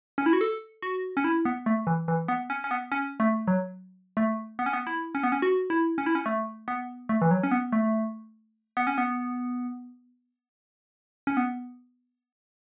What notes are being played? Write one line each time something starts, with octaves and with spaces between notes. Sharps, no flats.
C#4
E4
F#4
A4
F#4
C#4
E4
B3
A3
E3
E3
B3
C#4
C#4
B3
C#4
A3
F#3
A3
B3
C#4
B3
E4
C#4
B3
C#4
F#4
E4
C#4
E4
C#4
A3
B3
A3
E3
F#3
C#4
B3
A3
B3
C#4
B3
C#4
B3